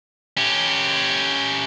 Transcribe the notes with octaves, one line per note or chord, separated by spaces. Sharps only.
C#4 G4